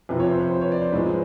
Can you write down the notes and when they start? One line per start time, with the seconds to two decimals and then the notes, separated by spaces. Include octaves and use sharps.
0.09 F2 C3 F3 B4
0.20 C#5
0.30 C5
0.40 B4
0.51 C5
0.61 C#5
0.72 D5
0.82 C5
0.92 G#2 F3 G#3 B4